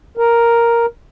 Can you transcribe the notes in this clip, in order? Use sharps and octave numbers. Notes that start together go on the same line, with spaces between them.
A#4